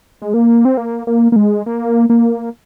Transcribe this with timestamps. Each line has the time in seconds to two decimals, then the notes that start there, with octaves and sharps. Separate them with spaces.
0.22 G#3
0.34 A#3
0.65 C4
0.77 A#3
1.07 A#3
1.32 A#3
1.36 G#3
1.66 A#3
2.10 A#3